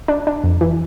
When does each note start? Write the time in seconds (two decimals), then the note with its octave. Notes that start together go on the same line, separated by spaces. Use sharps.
0.08 D4
0.27 D4
0.44 F2
0.61 E3